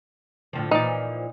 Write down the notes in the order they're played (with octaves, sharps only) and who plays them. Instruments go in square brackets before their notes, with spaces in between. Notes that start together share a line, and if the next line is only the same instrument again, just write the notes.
[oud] A2 D3 F3
[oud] A#2 E3 F3 [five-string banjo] D#4 D5